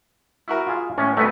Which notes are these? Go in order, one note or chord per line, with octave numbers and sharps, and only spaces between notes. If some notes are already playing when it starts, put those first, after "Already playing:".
E4 F#4 A#4
F4 G#4 F5
A2 C#4
D2 A3 B3 B4